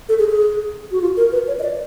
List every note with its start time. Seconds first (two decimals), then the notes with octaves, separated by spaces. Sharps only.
0.09 A4
0.19 G#4
0.30 G#4
0.92 F#4
1.01 F4
1.17 A#4
1.32 B4
1.48 C#5
1.59 D#5
1.63 D5